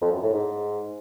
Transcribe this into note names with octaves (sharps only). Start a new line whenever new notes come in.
F2
F#2
A2
G#2